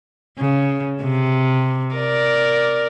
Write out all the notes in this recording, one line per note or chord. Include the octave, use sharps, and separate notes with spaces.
C#3
C3
A#4 D5